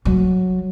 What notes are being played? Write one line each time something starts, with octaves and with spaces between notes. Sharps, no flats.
F#3